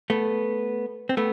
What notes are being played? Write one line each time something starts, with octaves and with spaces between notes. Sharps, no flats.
A3 B3
C4
A3 B3